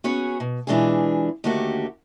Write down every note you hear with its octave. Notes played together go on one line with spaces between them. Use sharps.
B3 C#4 F#4 G#4 C#5
B2
B2 E3 G#3 D4 F4 G#4
D#2 D3 A3 A#3 F#4 G4